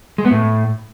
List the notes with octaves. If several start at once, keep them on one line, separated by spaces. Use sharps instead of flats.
G#3
B3
A2